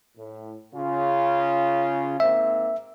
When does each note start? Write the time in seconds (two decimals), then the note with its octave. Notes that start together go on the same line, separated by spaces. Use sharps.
0.17 A2
0.74 C#3 F4
2.20 G#2 A#3 C4 E5